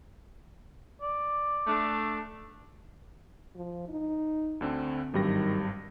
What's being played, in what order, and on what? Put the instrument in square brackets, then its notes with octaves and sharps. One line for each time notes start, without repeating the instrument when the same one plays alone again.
[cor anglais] D5
[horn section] A3 D4
[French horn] F3
D#4
[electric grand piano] D2 D3 C4
[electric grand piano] G#1 G2 A#6 [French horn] D#3 [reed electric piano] F#3 G3 G4